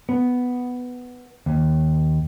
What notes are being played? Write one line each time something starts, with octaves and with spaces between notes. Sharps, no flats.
B3
D#2